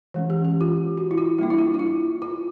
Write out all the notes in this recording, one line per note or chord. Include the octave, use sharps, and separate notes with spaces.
E3 G#3 C#4
G4
G4
F4
F#4
E4
F4
G3 A#3 D4 E4
E4
F4
F4
E4
F4